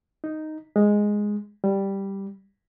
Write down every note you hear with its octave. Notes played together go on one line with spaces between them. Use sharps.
D#4
G#3
G3